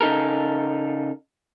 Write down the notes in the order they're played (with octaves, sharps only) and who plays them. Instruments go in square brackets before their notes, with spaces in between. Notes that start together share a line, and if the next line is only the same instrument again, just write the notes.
[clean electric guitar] C#3 D#4 A4 A#4